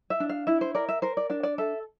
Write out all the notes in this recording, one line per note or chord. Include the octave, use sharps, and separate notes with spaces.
E5
D4
F5
E4 E5
C5
A#4 D5
E5
A#4 C5
D5
D4 D5
D5
A4 E5